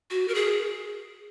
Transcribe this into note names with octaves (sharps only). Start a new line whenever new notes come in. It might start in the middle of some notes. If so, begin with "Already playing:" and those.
F#4
A#4
G#4